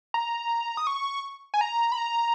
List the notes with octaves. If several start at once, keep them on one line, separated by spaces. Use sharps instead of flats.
A#5
D#6
C#6
G#5
A#5
B5
A#5